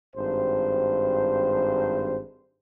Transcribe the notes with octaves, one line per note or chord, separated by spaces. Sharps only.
G#1 G2 C5